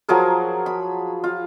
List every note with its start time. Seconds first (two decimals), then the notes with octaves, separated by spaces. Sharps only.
0.09 F3 F#3 G#4 A#4
0.66 B5
1.24 F4